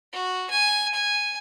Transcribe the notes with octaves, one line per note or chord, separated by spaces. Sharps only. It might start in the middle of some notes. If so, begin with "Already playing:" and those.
F#4
G#5
G#5